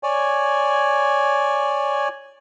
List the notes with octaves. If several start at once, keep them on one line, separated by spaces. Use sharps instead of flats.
C#5 D5 G#5